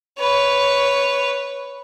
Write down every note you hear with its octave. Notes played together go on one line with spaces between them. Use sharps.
B4 C#5